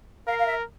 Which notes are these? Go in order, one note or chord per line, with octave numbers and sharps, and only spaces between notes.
A#4 F5
F5
E5